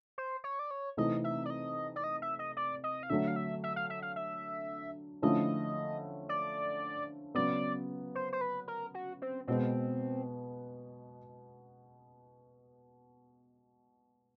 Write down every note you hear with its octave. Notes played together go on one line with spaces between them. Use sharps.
C5
C#5
D5
C#5
C3 E3 A3 C4 D#4 D#5
E5
D5
D#5
D5
D#5
E5
D#5
D5
D#5
F5
D3 F#3 A3 D4 E5
F5
E5
E5
F5
E5
F5
E5
D3 F3 A3 C#4 E4 D#5
D5
C#3 F#3 B3 D5
C5
C5
B4
A#4
F#4
C4
B2 G#3 B3 C4